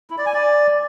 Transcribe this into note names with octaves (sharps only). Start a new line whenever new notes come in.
E4
D5
G#5
D5